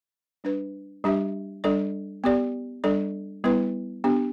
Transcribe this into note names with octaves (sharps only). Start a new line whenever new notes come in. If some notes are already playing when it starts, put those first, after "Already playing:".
G3 D4 B4
G3 D4 G4 E5
G3 D4 A4 D5
B3 G4 D5
G3 D4 A4 D5
G3 B3 E4 B4
B3 D4 G4